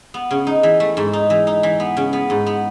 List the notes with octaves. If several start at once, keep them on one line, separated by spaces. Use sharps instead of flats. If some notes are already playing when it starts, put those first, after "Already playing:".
B3
C#3
D#4
E3
A3
G#2
D#4
E3
D#4
E3
B3
C#3
B3
G#2
B3